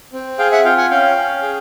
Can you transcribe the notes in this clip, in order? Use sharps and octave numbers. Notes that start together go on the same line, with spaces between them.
C4
G#4 F5 G5
E5 F#5
F4 F5 G5
F#5 G#5
C#4 F5 G5
C#4
G#4